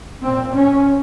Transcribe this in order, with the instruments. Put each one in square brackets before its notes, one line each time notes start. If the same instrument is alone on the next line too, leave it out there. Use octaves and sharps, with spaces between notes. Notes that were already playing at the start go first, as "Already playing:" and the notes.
[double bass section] A#2 C4
C#4